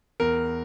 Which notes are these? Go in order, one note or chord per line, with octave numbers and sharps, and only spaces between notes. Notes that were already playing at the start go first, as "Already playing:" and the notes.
E2 A#4